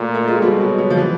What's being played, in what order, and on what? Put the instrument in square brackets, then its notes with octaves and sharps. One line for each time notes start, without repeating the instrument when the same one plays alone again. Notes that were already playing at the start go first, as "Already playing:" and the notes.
Already playing: [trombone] A#2 [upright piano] A3
[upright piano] A3
G#3
[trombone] B2 [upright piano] G3
[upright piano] F#3
F#3
F3
E3